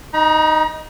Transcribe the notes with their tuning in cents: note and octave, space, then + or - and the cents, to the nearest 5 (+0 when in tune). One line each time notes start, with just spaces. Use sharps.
D#4 -5 A#5 +40